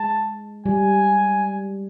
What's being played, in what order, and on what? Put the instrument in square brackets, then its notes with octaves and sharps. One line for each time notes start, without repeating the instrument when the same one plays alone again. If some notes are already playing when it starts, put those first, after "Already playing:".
Already playing: [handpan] G#3 [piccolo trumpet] A5
[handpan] G3 [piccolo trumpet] G#5